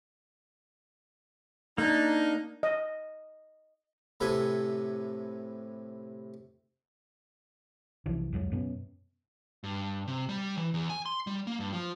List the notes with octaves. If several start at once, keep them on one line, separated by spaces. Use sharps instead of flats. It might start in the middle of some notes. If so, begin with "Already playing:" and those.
A#3 D4 D#4
D#5
A2 C3 A4 B4 G5 G#5
B1 C3 E3 F3
C2 F2 F#3 G#3
F#2 B2 B3 C#4
G2
C3
G3
E3
E2
G#5
C6
G3
A#3
G2
F3